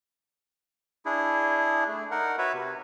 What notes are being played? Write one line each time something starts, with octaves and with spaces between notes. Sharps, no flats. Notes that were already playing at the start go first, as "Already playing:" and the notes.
D4 E4 G#4
A3
D#4 A#4 F#5
F#4 B4 C#5 E5
C3